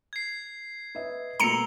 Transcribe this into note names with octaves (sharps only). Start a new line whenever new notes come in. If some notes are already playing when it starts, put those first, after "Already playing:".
G#6 C7
B4 D#5 E5
B2 A3 A#3 A#5 E6 C#7 F7 G7